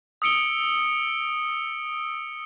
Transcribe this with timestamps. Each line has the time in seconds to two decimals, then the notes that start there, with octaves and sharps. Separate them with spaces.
0.22 D#6 E6 C#7 D7 G7